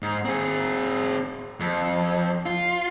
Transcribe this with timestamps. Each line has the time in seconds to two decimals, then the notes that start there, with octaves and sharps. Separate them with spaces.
0.02 G#2
0.25 C4 G#4
1.60 F2
2.46 F4